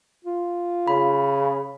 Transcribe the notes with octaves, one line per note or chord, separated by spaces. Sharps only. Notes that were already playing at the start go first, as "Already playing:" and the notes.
F4
C#3 B5